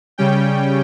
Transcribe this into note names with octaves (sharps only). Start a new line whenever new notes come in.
C#3 G3 C#4 G5